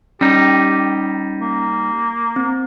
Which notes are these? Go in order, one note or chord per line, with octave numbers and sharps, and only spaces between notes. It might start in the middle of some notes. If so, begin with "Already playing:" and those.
G3 C#4 D#4 G4
A#3
C4